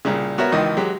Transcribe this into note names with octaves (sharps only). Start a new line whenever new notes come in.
C2 A#2 C#3
B3 F#4 A#4 C#5 E5
G#1 C#2 D#3 E3 D#5
F#3 G#3 G4